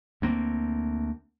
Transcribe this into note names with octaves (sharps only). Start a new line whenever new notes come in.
D2 A#3 C4